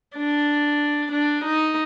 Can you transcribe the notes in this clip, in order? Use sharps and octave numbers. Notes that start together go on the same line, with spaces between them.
D4
D4
D#4